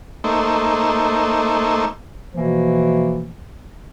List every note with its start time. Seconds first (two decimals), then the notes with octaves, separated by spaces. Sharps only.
0.24 A3 A#3 D#4 C5 E5
2.33 B2 E3 F3 A3 A#3